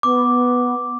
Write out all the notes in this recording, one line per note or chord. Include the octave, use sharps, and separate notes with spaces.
B3 D6